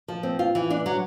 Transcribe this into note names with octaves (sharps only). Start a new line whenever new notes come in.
F3
C4
F4
E3
D4
F#3